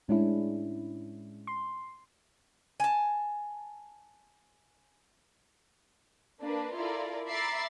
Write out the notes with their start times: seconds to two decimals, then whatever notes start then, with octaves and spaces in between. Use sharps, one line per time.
0.08 A2 G#3 C#4 D4 E4
1.47 C6
2.80 G#5 A5
6.41 A#3 D4 B4
6.76 E4 F4 A4 A#4 D5
7.27 E5 A#5 B5 D6 A6 C7